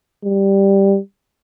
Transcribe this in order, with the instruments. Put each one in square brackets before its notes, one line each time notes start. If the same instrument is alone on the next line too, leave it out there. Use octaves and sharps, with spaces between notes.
[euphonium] G3